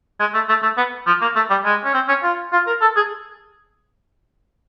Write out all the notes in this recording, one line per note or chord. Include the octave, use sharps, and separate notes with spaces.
G#3
A3
A3
A3
B3
F3
A#3
A3
G3
G#3
C#4
C4
C#4
F4
F4
A#4
A4
G#4